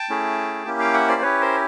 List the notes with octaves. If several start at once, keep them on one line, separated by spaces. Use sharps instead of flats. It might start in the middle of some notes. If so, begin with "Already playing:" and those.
Already playing: G5 A5
A3 C#4 E4 G#4
A#3 C#4 E4 G4
F5 G5
E5 F#5
C5 D5
C#4 E4 G4 B4 C#5
A#4 C5